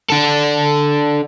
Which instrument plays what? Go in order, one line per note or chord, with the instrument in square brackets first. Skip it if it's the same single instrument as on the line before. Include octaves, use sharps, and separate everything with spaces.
[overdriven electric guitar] D4 A4